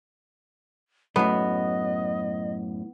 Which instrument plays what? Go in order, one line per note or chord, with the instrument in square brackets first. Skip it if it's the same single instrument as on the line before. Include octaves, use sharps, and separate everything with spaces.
[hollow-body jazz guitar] F#2 A2 [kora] B3 [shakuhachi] D#5